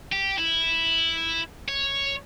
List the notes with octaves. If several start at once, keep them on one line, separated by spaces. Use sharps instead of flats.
G4
E4
C#5